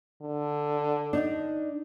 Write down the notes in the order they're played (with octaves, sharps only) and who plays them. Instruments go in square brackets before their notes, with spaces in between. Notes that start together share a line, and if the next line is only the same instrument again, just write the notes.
[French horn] D3
[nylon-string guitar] D4 D#4